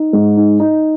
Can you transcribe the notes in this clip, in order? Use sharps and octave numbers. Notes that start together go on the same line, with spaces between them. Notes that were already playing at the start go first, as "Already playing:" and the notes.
Already playing: D#4
G#2
D#4
D#4